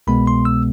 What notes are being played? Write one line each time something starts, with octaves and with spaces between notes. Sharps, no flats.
C2 B2 G#3 B3 B5
C6
E6